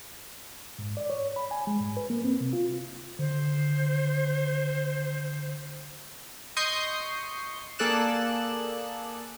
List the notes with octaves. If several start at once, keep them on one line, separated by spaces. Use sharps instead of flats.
G#2
D5
C#5
B5
G#5
G#3
G#2
B4
A#3
C4
C3
F4
D3 C5
D#5 C6 C#6 D#6 G6 C7
A#3 G#4 A4 D5 F#6 E7